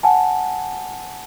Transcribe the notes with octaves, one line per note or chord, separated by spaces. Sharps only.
F#5 G#5 A5